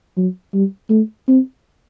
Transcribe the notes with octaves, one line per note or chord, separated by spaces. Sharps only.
F#3
G3
A3
C4